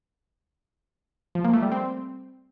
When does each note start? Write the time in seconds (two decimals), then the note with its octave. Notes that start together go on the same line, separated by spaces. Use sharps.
1.35 F3
1.44 A#3
1.53 A3
1.62 G3
1.72 C4